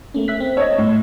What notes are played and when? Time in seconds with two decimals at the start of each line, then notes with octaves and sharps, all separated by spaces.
0.14 A3 A#3 C#4
0.28 E5 F#6 B6
0.40 C4
0.57 C#5 D#5 E6
0.78 A2